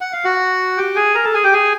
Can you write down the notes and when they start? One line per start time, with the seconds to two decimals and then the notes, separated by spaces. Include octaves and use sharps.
0.01 F#5
0.13 F5
0.25 F#4 F#5
0.77 G4 G5
0.96 G#4 G#5
1.15 A#4 A#5
1.25 A4 A5
1.34 G#4 G#5
1.44 G4 G5
1.53 G#4 G#5